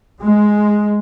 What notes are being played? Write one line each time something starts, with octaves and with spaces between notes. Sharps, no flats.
G#3